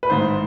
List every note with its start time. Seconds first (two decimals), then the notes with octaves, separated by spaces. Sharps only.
0.03 B4
0.10 A1 G#2 D#3 C5